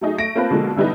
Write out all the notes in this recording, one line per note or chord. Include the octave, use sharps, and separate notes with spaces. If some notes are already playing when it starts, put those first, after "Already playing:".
F#3 A3 D#4 G#4
A3 A#6 D7
A#3 C4 F4 B4 A5
B2 D3 F3 G#3 A#3
D3 E3 G3 B3 D#4